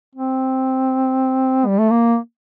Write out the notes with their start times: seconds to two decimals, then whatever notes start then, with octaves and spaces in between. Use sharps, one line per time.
0.15 C4
1.67 G3
1.79 A3
1.90 A#3